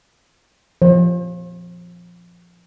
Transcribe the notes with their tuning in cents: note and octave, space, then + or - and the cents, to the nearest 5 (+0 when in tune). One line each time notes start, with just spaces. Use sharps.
F3 +0 C5 +40